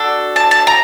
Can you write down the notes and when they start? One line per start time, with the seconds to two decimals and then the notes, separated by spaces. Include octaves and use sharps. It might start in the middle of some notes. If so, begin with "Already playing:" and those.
Already playing: D4 F#4 A4
0.36 A5
0.51 A5
0.67 A#5